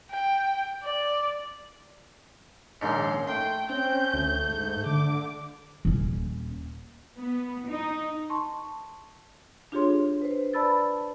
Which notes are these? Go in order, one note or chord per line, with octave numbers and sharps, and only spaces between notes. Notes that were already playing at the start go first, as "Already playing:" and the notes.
G5
D5
A#1 D#2 G#2 C#4 C6
A3 G5 C6
C4 C#4 G6
D2 A3
G#2
D3 D6
D#1 C#4
B3
D#4
A5 C6 C#6
D4 F4 G4 G#4 C#5 C6
B4 C5
B4 D5 A5 B5 E6 A6